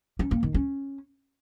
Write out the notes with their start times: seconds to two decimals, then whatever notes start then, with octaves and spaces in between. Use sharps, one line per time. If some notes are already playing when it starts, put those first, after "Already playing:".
0.19 C#4
0.31 A#3
0.43 D#3
0.54 C#4